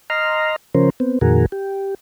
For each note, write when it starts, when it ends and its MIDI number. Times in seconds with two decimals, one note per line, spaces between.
0.10 0.56 75
0.10 0.56 82
0.10 0.56 84
0.10 0.56 89
0.75 0.90 49
0.75 0.90 53
0.75 0.90 61
0.75 0.90 70
0.75 0.90 72
1.00 1.19 59
1.00 1.19 60
1.21 1.46 41
1.21 1.46 46
1.21 1.46 51
1.21 1.46 66
1.21 1.46 68
1.21 1.46 70
1.52 1.95 67